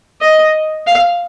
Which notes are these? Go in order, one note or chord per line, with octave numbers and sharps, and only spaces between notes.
D#5
F5